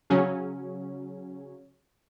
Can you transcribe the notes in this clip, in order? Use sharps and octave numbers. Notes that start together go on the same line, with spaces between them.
C#3 F#3 C#4